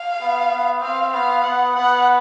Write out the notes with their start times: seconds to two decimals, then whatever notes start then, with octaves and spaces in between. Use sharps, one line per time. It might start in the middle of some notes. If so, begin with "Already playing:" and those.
Already playing: F5
0.21 B3
0.51 B3
0.82 C4 F5
1.13 B3 F5
1.44 B3 F#5
1.76 B3 F#5